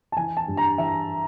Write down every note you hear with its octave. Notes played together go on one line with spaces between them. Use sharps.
A5
E3 G#5
A5
G2
A#5
E3 E5